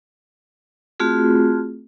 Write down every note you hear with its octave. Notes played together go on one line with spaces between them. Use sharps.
A3 C4 F4 F#4 G#4